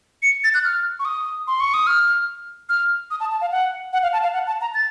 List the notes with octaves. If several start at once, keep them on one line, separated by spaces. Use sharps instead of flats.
C#7
A6
F#6
F6
C#6
D#6
C6
C#6
D#6
F6
F6
D#6
A5
A5
F5
F#5
F#5
F5
A5
F5
F#5
A5
A#5
A6